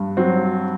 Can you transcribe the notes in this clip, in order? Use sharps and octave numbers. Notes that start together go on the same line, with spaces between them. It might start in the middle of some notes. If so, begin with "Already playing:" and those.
Already playing: G2
F#3 C4